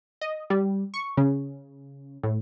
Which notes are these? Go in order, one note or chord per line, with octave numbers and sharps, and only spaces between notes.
D#5
G3
C#6
C#3
A2